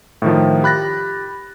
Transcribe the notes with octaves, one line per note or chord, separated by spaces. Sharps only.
A2 D#3 F3
G4 B5 F#6 A6 A#6